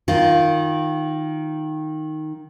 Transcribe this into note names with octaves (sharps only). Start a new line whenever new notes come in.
D#3 F4